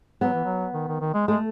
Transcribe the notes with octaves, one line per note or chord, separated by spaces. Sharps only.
F#3 B3
E3
F#3
D#3
D#3
D#3
G#3
G#3 A3